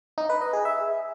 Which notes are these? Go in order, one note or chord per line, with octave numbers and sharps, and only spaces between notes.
D#4
B4
D#5
G#4
E5